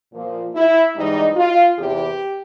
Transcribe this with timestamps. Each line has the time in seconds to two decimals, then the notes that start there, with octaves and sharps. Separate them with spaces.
0.13 A#2 F3
0.55 E4
0.96 G#2 E3 G3 D#4
1.36 F4
1.77 E2 C3 E3 G4